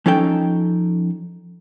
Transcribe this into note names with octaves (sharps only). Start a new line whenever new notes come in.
F3 C#4 D#4 A4 G5